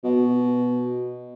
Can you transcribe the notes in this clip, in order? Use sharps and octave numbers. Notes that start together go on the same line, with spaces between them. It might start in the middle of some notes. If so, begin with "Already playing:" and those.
B2